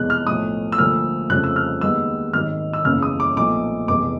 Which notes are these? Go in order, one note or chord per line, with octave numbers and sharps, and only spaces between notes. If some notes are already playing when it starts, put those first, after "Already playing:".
Already playing: F1 E2 B2 G#3 F#6
F6
B1 A2 F3 A3 D#6
E6
D2 D3 F3 A#3 F6
F2 C#3 F3 A3 F#6
E6
F6
D#2 D#3 G#3 B3 E6
G#1 G#2 D#3 F#3 F6
E6
F#1 E2 C#3 F6
D#6
D6
B1 A#2 F3 A3 D6
F1 E2 B2 D6